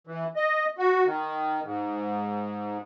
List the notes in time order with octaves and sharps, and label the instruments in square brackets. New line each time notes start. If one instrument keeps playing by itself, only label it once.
[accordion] E3
D#5
F#4
D#3
G#2